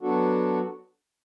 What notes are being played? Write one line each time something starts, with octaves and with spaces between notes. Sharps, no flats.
F#3 B3 D4 F#4 A4